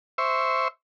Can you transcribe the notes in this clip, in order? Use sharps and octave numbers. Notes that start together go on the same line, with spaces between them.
C5 E5 C#6